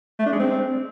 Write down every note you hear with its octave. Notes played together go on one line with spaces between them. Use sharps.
A3
D4
G#3
C4